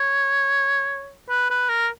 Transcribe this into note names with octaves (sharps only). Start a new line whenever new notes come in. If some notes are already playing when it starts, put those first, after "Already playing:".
Already playing: C#5
B4
B4
A#4